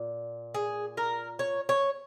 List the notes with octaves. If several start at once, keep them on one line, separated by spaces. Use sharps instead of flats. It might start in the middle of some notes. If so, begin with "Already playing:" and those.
Already playing: A#2
G#4
A#4
C#5
C#5